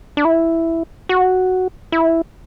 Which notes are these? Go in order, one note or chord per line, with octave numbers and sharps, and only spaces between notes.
D4
E4
F#4
E4